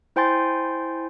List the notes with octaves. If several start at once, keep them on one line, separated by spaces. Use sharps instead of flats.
E4 C5 G5 G#5 C6 A6